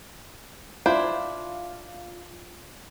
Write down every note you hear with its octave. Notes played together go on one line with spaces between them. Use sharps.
D4 E4 F4 C5